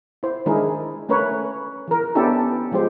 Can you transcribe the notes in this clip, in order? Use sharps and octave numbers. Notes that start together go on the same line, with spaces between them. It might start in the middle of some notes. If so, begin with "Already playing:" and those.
E4 C5
D#3 G#3 D4 E4 G#4 A#4
A3 C#4 A#4 B4 C#5
E3 A#4
B3 C#4 D4 E4 G4 A4
F3 G#3 F4 G4 C5